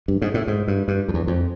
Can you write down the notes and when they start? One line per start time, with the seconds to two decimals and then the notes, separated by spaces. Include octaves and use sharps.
0.08 G2
0.22 G#2
0.34 A2
0.47 G#2
0.68 G2
0.88 G2
1.08 F2
1.14 E2
1.27 F2